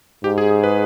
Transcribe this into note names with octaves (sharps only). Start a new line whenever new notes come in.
G#2 G4
G#4
G#4
B4